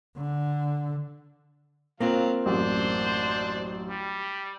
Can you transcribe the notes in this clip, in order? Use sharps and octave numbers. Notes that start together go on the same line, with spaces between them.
D3
F#3 A#3 C4 F4 F5
A1 F#2 D4 C5
G3